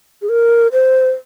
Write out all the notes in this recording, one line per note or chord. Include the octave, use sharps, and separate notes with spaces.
G#4
A#4
C5